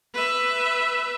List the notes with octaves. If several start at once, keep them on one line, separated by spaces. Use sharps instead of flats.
B4 E5